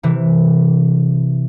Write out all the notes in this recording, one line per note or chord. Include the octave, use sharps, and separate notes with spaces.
C3 E3